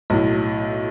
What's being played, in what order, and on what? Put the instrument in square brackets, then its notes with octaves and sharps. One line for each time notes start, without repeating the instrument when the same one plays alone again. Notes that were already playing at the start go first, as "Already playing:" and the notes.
[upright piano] B1 A2